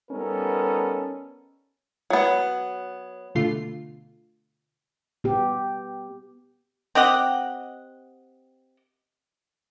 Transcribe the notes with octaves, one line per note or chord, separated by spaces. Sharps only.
G3 B3 C#4 D#4 A4 A#4
F#3 B3
B2 D3 A3 F4 C7
B3 G4
C4 G4 D#5 F#5